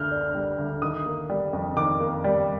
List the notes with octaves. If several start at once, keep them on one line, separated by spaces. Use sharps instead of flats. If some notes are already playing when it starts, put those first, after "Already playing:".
Already playing: D2 D3 F6 G6
D4
G3
D2
D#3 D#6
A#3
G3
F2
D#3 D6
A#3
G3